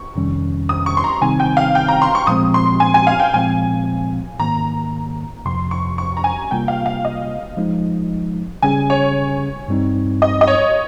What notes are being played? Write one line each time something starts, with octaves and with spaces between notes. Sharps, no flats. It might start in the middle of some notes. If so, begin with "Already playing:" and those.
Already playing: C#6
F2 C3 D#3 G3 C#4
D#6
C#6
C6
A#5
C3 D#3 G3 C4 D#4 G#5
G5
F5
G5
A#5
C6
C#6
A#2 F3 G#3 C4 D#6
C6
G#5
G#5
F5
G5
A#2 F3 G#3 C4 G#5
G#2 D#3 A#3 A#5
F2 C3 F3 C6
C#6
C#6
A#5
G#5
C3 G3 A#3 F4 G5
F5
F5
D#5
F3 G#3 D#4
C#3 G3 C#4 G#4 G#5
C#5
G2 G3 C4 D#4
D#5
D#5
C#5